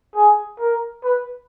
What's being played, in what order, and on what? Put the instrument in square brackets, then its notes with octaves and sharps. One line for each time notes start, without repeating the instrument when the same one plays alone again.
[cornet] G#4
A#4
B4